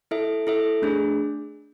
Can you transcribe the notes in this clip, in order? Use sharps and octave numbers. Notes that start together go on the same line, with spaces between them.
E4 A4 E5
E4 A4 E5
A3 D4 G#4